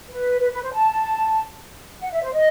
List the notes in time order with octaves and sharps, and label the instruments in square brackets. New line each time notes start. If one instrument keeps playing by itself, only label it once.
[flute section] B4
B4
B4
C5
A5
F#5
E5
C5
D#5